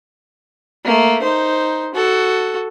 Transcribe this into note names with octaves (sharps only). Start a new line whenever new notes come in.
A3 A#3
D#4 C5
F#4 A4